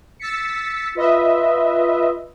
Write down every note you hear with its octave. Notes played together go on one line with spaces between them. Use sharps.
E6 A6 B6 C#7
F4 B4 D#5 E5